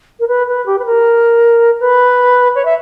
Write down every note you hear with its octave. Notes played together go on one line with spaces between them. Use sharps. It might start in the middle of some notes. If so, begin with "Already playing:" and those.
A#4
B4
B4
G4
B4
A#4
B4
C#5
E5